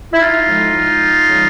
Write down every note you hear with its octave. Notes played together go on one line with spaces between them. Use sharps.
E4
D#4 F4
A2 F3 G#3
C#3 E3 G3